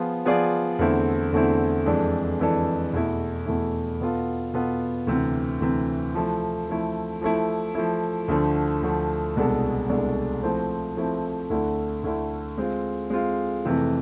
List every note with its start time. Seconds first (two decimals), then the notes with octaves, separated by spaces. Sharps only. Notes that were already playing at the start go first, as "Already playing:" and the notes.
Already playing: F3 B3 F4 G#4
0.25 F3 B3 F4 G#4 D5
0.79 E2 D3 A3 C4 E4
1.32 E2 D3 A3 C4 E4
1.86 F2 E3 G#3 D4 A4
2.40 F2 E3 G#3 D4 A4
2.93 E2 B2 A3 E4
3.46 E2 B2 A3 E4
4.00 B2 B3 F4 A4
4.54 B2 B3 F4 A4
5.07 D2 C3 E3
5.60 D2 C3 E3
6.15 F3 A3 E4
6.68 F3 A3 E4
7.21 F3 A3 E4
7.75 F3 A3 E4
8.28 D2 D3 F3 A3
8.83 D2 D3 F3 A3
9.36 C2 B2 G#3 D4 A4
9.89 C2 B2 G#3 D4 A4
10.43 F3 A3 C4 E4
10.97 F3 A3 C4 E4
11.50 D2 D3 A3 E4
12.04 D2 D3 A3 E4
12.58 G#3 C4 F4
13.10 G#3 C4 F4
13.65 F2 C3 E3 A3